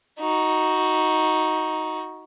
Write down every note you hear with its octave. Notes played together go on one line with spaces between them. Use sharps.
D#4 F#4